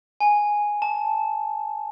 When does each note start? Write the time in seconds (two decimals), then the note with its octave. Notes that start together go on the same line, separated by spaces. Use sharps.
0.20 G#5
0.82 A5